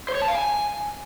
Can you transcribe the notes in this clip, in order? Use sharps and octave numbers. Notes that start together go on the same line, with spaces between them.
C5
C#5
A5
F5
G#5